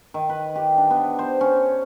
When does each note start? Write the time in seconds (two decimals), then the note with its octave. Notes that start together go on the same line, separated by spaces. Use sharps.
0.14 D#3
0.29 B4
0.56 G4
0.77 D4
0.90 B3
1.19 C5
1.41 C#4